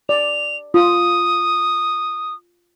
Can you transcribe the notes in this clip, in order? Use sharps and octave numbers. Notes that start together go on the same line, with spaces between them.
D5 F7
F4 D#6